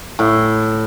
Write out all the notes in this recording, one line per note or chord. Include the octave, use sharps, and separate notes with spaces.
A2